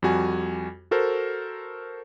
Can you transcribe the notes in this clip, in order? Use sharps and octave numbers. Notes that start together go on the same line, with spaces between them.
F2 G3 F#4 G#5
F#4 A4 A#4 C5